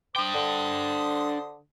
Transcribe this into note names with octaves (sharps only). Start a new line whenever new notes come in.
D4 C5 G5 D#6
D3